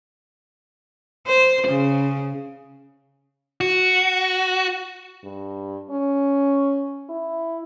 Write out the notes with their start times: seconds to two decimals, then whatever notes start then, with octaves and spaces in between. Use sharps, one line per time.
1.28 C5
1.67 C#3
3.61 F#4
5.24 G2
5.90 C#4
7.09 E4